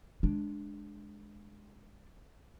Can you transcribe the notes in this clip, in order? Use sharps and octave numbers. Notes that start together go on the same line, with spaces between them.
G#3 D4